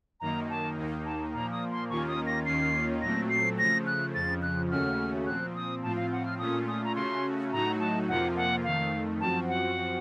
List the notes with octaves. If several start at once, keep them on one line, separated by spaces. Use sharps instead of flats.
F#2 D#3 A#3 D#4 A#5
A5
D#2 D#3 A#3 D#4
A5
A#2 F3 A#3 A#5
D#6
C6
D#2 D#3 A#3 C#4 F4 C#6
D#6
A#6
D#2 D#3 A#3 C#4 F4 C7
A#2 F#3 A3 C4 A#6
C7
C#3 F3 A3 A#6
F#6
F2 C#3 F3 A6
F#6
D#2 C#3 A3 C#4 F#4 F6
A#2 F3 C4 F#6
D#6
A2 F3 C4 F4 A5
F5
F#5
F6
A#2 A3 C#4 F4 D#6
D#6
A#5
C#3 A3 C#4 F#4 C6
A2 F#3 A3 D#4 F#4 A#5
A5
F2 C3 F3 A#3 F4 F#5
F#5
F2 D#3 A3 F5
F#2 F3 C4 F#4 A5
F#5